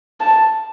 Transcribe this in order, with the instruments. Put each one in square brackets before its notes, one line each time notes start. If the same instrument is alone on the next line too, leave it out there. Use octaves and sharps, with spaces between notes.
[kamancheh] A5